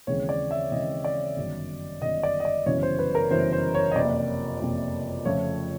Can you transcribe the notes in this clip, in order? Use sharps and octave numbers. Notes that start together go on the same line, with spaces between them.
D#2 C#3 E3 G#3 C4 C#5
D5
E5
D#2 C#3 E3 G#3 C4 D#5
D5
G1 F#2 D#3
G1 F#2 D#3 D#5
D5
D#5
D5
G1 F#2 C#3 E3 C#5
C5
B4
A#4
G1 F#2 C#3 E3 C5
C5
C#5
D#5
F#1 F2 C3 D5
F#1 F2 C3
F2 C#3 F3 A3 C#5